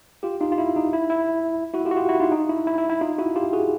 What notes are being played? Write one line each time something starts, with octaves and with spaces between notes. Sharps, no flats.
F4 G4
D#4 F4
F4
E4
D#4
E4
E4
E4 F#4
F4 G4
F#4
F4 G4
E4 F#4
D#4 F4
D#4
E4
E4
E4
E4
D#4 F4
E4 F#4
F4 G4
F#4 G#4